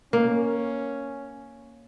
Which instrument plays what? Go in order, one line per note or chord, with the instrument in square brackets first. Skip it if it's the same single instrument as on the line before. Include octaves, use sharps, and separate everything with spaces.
[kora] A#3 [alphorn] C#4